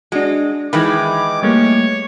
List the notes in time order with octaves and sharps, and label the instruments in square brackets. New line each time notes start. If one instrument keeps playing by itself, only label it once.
[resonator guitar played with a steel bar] G#3 [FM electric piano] D4 F#4
[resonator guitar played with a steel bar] D#3 E3 G#3 [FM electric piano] B5 G#6 [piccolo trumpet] D6
[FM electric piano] G3 A3 A#3 [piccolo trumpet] C#5